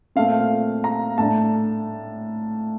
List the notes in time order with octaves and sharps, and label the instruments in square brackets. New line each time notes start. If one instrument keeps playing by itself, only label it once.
[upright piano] A#2 A3 C4 F5
F5
A#5
A2 A3 D4 A5